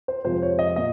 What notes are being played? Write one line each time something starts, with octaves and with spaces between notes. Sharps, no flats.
C5
F2 C3 F3 G#3 C5
C#5
D#5
A#2 D#5